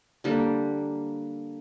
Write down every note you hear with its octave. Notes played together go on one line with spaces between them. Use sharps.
D3 G3 A#3